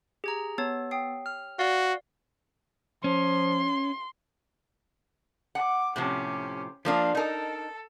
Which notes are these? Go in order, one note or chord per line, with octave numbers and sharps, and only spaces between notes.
G4 G#4 A#5 G#6 F7
B3 C#5 A5 G#6
G5 D#6 C7
F6
F#4 D5 F5 A6
F3 C#4 C6
F#5 D6
A2 C3 F3 C#4 G4
F3 A#3 D4 F5
D#4 A4 A#4